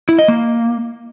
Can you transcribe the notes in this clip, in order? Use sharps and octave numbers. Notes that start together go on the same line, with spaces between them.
E4
D#5
A#3